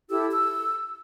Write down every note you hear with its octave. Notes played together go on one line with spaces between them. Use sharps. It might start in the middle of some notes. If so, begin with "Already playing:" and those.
E4 G4 A4 E6
E6